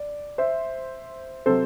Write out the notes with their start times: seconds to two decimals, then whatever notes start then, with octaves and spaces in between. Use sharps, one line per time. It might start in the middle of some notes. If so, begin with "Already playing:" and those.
Already playing: D5
0.38 C5 E5
1.46 C3 F#3 A4 C5